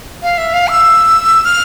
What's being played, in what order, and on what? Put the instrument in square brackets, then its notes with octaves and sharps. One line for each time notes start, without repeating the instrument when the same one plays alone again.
[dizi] F5
E5
F5
E6
F6